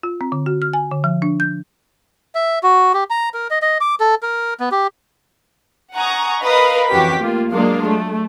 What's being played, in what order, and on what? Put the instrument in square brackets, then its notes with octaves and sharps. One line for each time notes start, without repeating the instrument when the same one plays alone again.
[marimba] F4
C4
D3
F#4
F6
G#5
D3
F3
D4
G6
[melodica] E5
F#4
G4
A#5
A#4
D#5
D#5
D6
A4
A#4
B3
G4
[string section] F#5 G#5 A#5 C#6 D#6
A#4 B4 D#5 F5 B5 D#6
F2 E3 C#4 F#4 G4 B6
A3 A#3 F4
F#3 G#3 A#3 D4 F4
A3